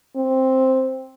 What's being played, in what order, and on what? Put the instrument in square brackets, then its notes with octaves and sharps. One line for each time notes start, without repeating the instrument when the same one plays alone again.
[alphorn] C4